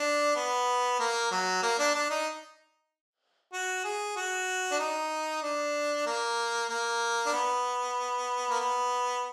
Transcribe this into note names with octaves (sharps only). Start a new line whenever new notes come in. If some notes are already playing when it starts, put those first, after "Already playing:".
Already playing: D4
B3
A#3
F#3
A#3
D4
D4
D#4
F#4
G#4
F#4
D4
D#4
D4
A#3
A#3
D4
B3
A#3
B3